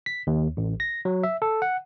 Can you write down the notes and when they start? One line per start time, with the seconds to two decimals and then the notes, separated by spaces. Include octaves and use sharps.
0.06 B6
0.27 D#2
0.57 A1
0.80 A#6
1.05 F#3
1.23 E5
1.42 A4
1.62 F#5